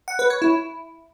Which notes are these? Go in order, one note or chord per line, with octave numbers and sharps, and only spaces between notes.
F#5
B4
C#5
E4